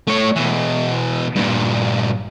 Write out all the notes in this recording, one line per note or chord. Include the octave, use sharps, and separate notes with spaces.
A3 C#5
B2 E3
G2 A#2